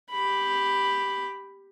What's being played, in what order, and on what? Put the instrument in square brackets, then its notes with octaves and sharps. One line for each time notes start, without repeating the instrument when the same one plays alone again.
[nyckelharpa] G4 B5